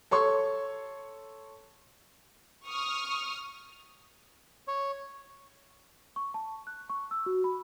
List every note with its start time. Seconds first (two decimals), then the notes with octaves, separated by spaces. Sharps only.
0.11 A4 C#5 C6 C#6
2.68 C#6 D#6 F6
4.68 C#5
6.16 C#6
6.34 A5
6.67 F#6
6.90 C#6
7.11 E6
7.26 F#4
7.44 B5